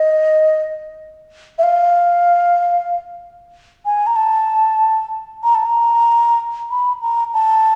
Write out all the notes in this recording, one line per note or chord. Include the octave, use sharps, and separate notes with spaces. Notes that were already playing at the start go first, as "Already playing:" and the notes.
Already playing: D#5
E5
F5
G#5
A#5
A5
A#5
A5
A#5
B5
A#5
A5